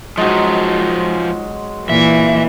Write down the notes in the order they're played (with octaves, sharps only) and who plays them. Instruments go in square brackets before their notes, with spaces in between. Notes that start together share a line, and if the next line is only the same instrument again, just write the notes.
[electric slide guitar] F3 D#4 [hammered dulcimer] F#3 G#3
[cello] A#2 E3 [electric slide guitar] E5